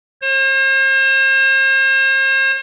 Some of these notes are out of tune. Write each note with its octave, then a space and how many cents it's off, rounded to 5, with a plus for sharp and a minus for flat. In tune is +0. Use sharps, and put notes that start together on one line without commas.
C5 +45